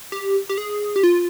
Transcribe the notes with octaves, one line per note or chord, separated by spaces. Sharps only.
G4
G4
G#4
G4
F4